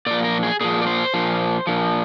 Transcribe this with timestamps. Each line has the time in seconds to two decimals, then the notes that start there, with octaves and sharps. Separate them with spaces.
0.06 A#2 F3 D5
0.24 A#4
0.43 G#4
0.61 A#2 F3 G#4
0.82 D5
0.87 C5
1.14 A#2 F3
1.67 A#2 F3